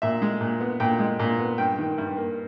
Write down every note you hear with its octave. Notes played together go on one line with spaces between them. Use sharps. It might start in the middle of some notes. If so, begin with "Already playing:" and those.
A#2 E5
G#3
A#2
B3
A#2 G5
G#3
A#2
B3
G2 G5
D#3
G2
A#3